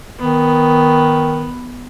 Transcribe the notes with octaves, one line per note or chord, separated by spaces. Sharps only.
D#3 B3